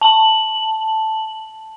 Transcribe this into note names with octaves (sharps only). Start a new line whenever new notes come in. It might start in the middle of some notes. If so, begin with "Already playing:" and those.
A5 F#7